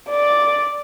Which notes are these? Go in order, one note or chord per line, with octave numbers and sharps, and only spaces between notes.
D5